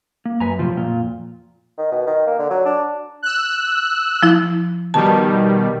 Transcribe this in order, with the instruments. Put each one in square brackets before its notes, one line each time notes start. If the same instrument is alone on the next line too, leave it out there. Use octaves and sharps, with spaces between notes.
[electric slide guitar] A#3
[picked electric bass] F#2 [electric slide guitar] B4 G#5 A#5
[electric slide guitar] A2 C3 [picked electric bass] F3
[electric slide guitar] F2 F4 [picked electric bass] A#2
[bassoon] D#3
B2
D#3
A#3
D3
F#3
D4
[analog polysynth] E6 F#6
[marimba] F3 E4
[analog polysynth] B2 D#3 G3 [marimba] A5